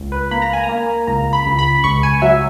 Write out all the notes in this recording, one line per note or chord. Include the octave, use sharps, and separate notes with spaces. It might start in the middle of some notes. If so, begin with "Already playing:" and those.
Already playing: C#2
B4
A#3 B5
A#5
G#5
A#5
A#3
C#2 A#5
B5
C#2
B5
C#2 C#6
G#5
F#3 E5